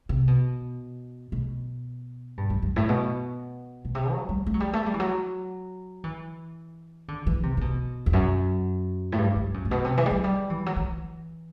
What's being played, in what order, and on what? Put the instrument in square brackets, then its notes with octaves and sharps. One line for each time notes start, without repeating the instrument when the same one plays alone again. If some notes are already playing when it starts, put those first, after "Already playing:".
[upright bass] C3
B2
B2
G2
F#2
F#2
A2
B2
B2
C3
F#3
G3
A3
F#3
G3
A3
G3
E3
F#3
E3
D3
E3
C3
C3
B2
E2
F#2
A2
G2
G2
F#2
A2
B2
C3
E3
G3
F#3
G3
E3
F#3
E3